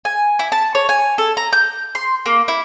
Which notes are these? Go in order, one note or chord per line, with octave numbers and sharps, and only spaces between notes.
G#5
E4
A5
C#5
G#5
A4
A#5
G6
C6
A#3
E4